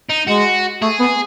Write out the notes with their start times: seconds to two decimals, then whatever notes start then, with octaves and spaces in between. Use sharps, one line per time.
0.09 D#4
0.27 G#3 F#4
0.82 A3 G#4
1.00 B3